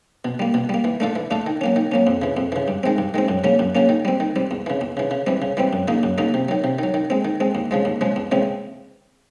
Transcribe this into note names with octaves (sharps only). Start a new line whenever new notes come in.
B2
G3 A#3
B2
G3 A#3
E3
A3 D4 F4 A4
E3
A3 D4 F4 A4
D#3
F#3 A#3 C#4
D#3
F#3 A#3 C#4
F2
C#3 E3
F2
C#3 E3
G2
D#3 G#3 C4
G2
D#3 G#3 C4
F#2
C#3 F#3 A#3 C#4
F#2
C#3 F#3 A#3 C#4
D#3
G3 C4
D#3
G3 C4
E2
C#3 E3
E2
C#3 E3
C#3
E3 G3 C4
C#3
E3 G3 C4
F#2
C#3 F#3 A#3 D#4
F#2
C#3 F#3 A#3 D#4
C3
D#3 F#3
C3
D#3 F#3
D#3
G#3 C4
D#3
G#3 C4
D#2
C#3 F3 G#3
D#2
C#3 F3 G#3
E2
C#3 E3 G#3 C4